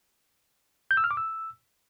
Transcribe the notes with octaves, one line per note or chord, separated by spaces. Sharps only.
G6
E6
F6
D6
E6